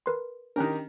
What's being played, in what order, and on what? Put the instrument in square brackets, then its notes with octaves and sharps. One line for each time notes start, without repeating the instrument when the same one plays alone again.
[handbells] A#4 B4 C6
[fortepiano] D#3 G4 A#4 [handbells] C#4 D4